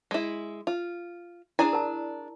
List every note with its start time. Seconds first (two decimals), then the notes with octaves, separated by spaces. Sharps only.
0.11 G#3 E4
0.67 F4
1.59 D4 E4 G#4 D5 G#5 A#5
1.73 A#4 A5